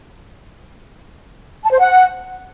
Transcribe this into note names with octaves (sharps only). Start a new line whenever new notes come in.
A5
C5
F#5